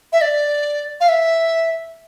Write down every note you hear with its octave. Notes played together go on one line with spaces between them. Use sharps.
E5
D5
F5
E5